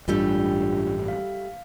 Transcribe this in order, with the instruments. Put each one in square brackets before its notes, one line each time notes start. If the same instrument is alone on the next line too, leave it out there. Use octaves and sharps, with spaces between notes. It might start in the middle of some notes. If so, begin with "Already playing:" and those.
[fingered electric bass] A1 G2 [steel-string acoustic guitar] G3 A3 G4 [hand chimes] D4 F4
[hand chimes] F5